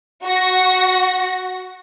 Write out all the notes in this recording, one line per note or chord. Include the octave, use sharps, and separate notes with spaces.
F#4 A#6